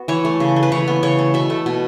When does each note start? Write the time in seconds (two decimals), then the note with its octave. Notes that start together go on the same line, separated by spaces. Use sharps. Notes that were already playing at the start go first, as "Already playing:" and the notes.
Already playing: B3 F#4
0.08 E3 C#5
0.25 A3
0.40 C#3
0.56 A3
0.63 B4
0.72 E3 C#5
0.88 B3
1.03 C#3 C#5
1.19 A3
1.34 B2 E5
1.50 A3
1.66 B2